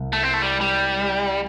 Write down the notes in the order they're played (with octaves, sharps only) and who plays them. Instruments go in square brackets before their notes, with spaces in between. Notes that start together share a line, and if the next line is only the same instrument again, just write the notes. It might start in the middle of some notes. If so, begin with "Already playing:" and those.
Already playing: [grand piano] C2 C3
[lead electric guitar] A3
C4
A3
G3
G3